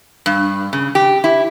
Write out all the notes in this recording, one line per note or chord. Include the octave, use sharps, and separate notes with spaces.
G2
C#3
G4
E4